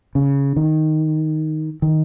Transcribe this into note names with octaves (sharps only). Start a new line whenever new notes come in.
C#3
D#3
D#3